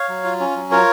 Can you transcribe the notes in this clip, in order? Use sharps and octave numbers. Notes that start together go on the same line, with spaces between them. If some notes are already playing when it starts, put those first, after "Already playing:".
Already playing: C#5 F5
F#3
F4
C#4
F#3
F4 A#4 C#5